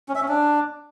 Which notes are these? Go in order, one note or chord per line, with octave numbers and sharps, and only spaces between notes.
C#4
E5
C#4
D4